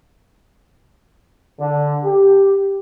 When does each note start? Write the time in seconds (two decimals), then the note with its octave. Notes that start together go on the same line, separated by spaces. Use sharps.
1.60 D3
2.04 G4